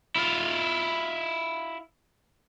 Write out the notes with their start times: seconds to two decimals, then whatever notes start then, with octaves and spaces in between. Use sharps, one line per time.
0.16 E4 F4